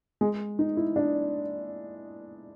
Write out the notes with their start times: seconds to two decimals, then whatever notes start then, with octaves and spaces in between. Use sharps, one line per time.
0.21 G#3
0.59 D#4
0.77 E4
0.96 D4